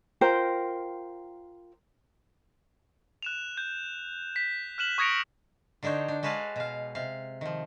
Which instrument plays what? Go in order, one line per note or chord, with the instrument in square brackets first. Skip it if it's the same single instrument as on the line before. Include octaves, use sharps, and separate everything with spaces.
[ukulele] F4 A#4 C5 G5
[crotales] F#6 E7 F7
G6
B6
F6 F#6 E7 F#7
C#6 D#6 G#6 A#6 C#7 D7
[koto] D3 D4 D#4 C5 C#5
D4
G#3 F#4 B4 C#5 F5 A5
B2 F5
C3 F5
D#3 F3